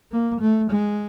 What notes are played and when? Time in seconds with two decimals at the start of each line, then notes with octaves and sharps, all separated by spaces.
0.12 A#3
0.41 A3
0.70 G#3